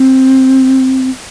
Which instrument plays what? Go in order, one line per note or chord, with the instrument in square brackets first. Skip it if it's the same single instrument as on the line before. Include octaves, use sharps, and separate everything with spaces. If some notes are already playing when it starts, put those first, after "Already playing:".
Already playing: [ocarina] C4